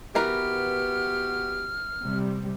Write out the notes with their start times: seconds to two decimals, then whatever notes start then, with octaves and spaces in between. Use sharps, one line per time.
0.15 E3 B3 F#4 G4 A#4 B4 F6
2.03 C3 G3